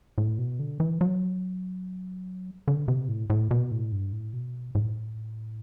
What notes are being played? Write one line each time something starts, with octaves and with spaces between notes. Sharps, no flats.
A2
B2
D3
E3
F#3
D3
C3
A2
A2
B2
A2
G2
A2
B2
A2